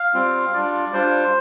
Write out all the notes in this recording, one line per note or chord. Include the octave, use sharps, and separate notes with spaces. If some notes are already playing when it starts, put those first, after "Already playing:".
Already playing: F5
G3 C4 F4
G3 D4 F4 D5
G3 D4 F4 C5